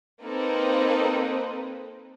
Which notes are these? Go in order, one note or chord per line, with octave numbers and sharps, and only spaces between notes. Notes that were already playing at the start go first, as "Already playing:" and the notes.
A#3 C4 D#4 A4 B4